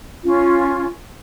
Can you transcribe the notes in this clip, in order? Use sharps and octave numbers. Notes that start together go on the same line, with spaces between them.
C#4 F4